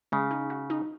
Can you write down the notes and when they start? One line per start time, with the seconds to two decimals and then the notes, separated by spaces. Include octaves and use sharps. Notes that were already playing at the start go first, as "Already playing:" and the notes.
0.12 C#3 G#3
0.31 D#4
0.50 F#4
0.70 D#4